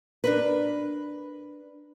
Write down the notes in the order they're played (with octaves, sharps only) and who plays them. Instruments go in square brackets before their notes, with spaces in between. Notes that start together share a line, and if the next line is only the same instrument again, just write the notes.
[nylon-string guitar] D4 A#4 B4